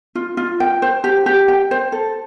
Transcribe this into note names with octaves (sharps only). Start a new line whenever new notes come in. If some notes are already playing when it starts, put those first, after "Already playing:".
F4
F4
G5
C5
G4
G4
G5
C5
A4